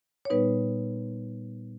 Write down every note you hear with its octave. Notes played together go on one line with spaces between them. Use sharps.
C#5
A#2 G3 B3 D#4 B4